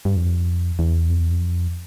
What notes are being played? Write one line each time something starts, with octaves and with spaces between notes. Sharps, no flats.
G2
F2
E2
F2
E2
F2